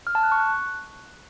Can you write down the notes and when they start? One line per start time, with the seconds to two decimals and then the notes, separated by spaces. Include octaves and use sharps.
0.07 F6
0.15 A5
0.23 F#6
0.32 C#6
0.40 F#6